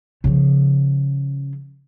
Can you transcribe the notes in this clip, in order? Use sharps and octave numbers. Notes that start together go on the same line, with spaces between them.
C#3 F3